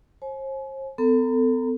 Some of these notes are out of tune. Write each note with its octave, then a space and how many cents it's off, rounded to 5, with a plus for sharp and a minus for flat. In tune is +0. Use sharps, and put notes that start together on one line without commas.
C5 +40 G#5 +40
B3 +45 A4 +20 A#5 +0